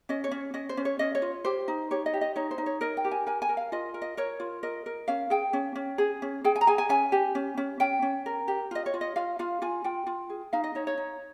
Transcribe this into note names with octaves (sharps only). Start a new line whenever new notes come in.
C#4 D#5
C#5
C#4
C#4 D#5
C5
C#4
C#5
C#4 D#5
C#5
F4
G4 C5
D#4
G4 C#5
D#5
G4
D#5
D#4 C#5
C5
D#4
C#5
A#4 D#5
G5
G4
G#5
A#4 G#5
G#5
A#4
F5
F4 D#5
A#4
D#5
A#4 C#5
F4
A#4 D#5
A#4
C#4 F5
G#4 G5
C#4
C#4
G#4
C#4
G#4 G5
G#5
A#5
G#4 G#5
G#5
C#4 G#5
G4
C#4
C#4
C#4 G5
C#4
A#4
G4
F4 D#5
C#5
F4
D#5
F4 F5
F4 F5
F4 G#5
F4 G5
F4
G#4
D#4 F5
D#5
D#4 C#5
C#5
D#4